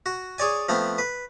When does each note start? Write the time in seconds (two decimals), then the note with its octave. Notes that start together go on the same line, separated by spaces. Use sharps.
0.06 F#4
0.38 G#4 C#5 D5 G#5
0.69 F3 A3 B3 C4
0.98 B4